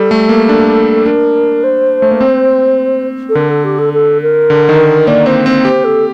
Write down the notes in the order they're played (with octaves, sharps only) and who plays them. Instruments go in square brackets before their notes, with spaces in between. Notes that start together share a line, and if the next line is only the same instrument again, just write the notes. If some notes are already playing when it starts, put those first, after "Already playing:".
Already playing: [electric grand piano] G3 [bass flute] A4
[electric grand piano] A3
A#3
D4
[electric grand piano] D4 [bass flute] A#4
[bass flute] C5
[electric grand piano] A3
A#3
C4
[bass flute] A4
[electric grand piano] D3 [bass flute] A#4
[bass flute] A4
G4
A4
A4
A#4
[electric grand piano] D3
D#3
[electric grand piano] A#3 [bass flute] D5
[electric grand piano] C4 [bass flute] C5
[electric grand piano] C4
[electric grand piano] G4 [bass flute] C5
[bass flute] A4